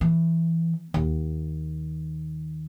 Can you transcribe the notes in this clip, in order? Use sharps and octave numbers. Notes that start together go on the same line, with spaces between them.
E3
D#2